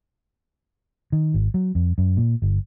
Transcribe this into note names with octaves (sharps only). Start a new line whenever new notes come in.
D#3
G#1
F#3
F2
F#2
A#2
G1